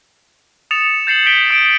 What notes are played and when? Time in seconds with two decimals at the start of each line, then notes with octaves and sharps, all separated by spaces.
0.71 D#6 A6 C#7 E7 F7
1.07 G6 A6 C7 C#7 F#7
1.26 G6 B6 D7 G7
1.51 D#6 D7